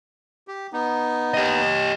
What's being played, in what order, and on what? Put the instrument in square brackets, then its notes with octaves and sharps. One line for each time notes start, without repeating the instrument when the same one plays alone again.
[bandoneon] G4
B3 D#4
[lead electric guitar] G4 D#5